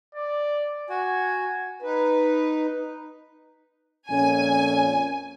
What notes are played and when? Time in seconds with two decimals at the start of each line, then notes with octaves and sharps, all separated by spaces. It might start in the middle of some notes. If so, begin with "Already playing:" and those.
0.15 D5
0.90 F#4 G#5
1.82 D#4 B4
4.10 F2 A#2 C#4 G#5